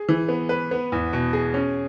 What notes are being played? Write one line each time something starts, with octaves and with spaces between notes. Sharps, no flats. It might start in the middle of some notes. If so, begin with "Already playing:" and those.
Already playing: G#4
E3
B3
B4
B3
E2
B2
G#4
C#4